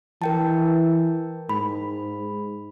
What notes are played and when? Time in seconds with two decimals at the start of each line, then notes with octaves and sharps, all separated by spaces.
0.22 E3 A#4 G5 A5
1.49 G#2 B5